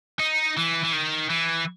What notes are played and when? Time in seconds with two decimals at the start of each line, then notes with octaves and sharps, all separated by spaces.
0.19 D#4
0.57 E3
0.84 E3
0.93 D#3
1.30 E3